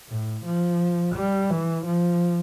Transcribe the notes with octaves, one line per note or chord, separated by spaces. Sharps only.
A2
F3
G3
E3
F3